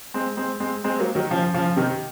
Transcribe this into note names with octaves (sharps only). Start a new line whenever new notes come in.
G#3 C4
G#3 C4
G#3 C4
G#3 C4
F#3 A#3
D#3 F#3
C#3 F3
C#3 F3
C3 D#3